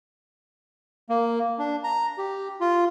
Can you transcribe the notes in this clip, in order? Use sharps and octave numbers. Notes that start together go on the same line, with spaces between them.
A#3
D4
A#5
G4
F4